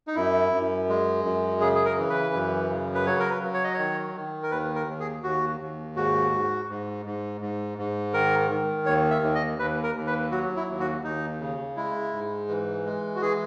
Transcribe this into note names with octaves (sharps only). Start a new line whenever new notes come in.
D#4
F#2 E4
F#2
G#3
F#2
C#3 G#4
G#4
A#4
E3
B4
F#2
C#3
B4
F#3 C#5
A#4
B4
F#3
C#5
D#5
D#3 C#5
D#3
A#4
D#2 B4
A#4
D#2
G#4
D#2 F#4
D#2
G#2 F#4
G#2
G#2
G#2
G#2
G#2
D#3 A#4
D#3
D#2 C#5
E5
D#2
D#5
D#2 B4
A#4
D#2
B4
F#3 F#4
E4
D#2
F#4
D#2 D#4
C#3
G#3 E4
G#2
E3
G#3
F#4
E3 G#4